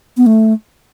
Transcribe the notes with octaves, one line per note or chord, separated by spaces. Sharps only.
B3
A3